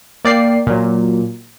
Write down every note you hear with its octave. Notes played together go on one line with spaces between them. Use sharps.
A#3 D5 G5 C7
A#2 F#3